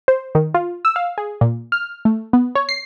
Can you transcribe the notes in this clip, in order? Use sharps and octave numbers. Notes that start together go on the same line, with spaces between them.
C5
D#3
F4
E6
F5
G#4
A#2
F6
A3
B3
C#5
C7